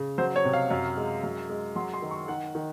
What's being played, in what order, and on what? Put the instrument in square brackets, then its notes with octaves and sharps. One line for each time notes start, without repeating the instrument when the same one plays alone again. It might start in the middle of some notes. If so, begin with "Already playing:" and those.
Already playing: [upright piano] C#3
F#3 C5
C#5
C3
F5
F#2
G#3
F#2
G#3
F#3 C6
C6
D#3
C#6
D#3 F#5
D#3